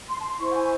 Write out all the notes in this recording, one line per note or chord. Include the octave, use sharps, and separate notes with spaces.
C6
A5
C6
E4 C5 C#6
F#5
G#5